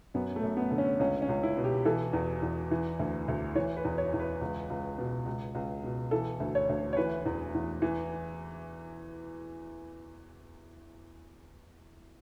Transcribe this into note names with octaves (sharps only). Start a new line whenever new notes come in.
F#2 B3
A3
F#2
B3
D3
C#4
C#2 C#4
C#4
C#2
E4
B2
G4
E3 A4
E2
E2
E3
D2
D2
E3 C#5
B4
E2
C#5
E2
B4
C#2
C#2
B2
C#2
C#2
B2
E3 A4
D2
C#5
D2
C#5
E3 B4
E2
E2
E3